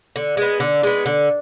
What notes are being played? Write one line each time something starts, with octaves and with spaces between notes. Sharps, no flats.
D3
G#3 B3
D3
G#3 B3
D3